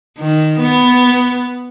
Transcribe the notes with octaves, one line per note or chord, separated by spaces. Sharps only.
D#3
B3